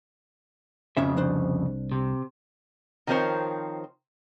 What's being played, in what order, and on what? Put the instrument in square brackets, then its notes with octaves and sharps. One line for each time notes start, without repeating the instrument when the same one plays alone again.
[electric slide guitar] F2 C#3 [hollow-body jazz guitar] F3 C#4 E5
[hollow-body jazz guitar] C2 D4 C5
[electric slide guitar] C3
[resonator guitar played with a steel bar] D#3 F3 C4 A#4 C5 C#5